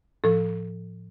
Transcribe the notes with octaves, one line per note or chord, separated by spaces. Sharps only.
A2 F3 A4